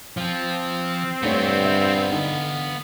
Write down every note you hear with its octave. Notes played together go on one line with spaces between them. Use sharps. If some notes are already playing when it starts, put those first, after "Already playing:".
F3 C4
G2 A3 B3 D4 F4 C#5
E5
D3 D#4